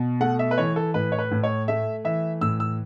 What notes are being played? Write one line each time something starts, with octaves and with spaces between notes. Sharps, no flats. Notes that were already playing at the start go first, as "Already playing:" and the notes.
Already playing: B2
A3 F#5
E5
B4
E3 C#5
A4
A2 B4
C#5
B4
A2
C#5
A3 E5
E3 E5
A2 E6
E6